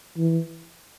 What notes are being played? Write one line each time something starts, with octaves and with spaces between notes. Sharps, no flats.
E3